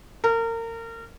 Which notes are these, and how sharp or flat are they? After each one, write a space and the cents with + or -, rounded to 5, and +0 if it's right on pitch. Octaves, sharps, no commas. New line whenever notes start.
A#4 -30